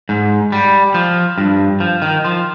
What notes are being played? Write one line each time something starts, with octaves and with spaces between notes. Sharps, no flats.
G#2
G3
F3
G2
F3
D#3
F3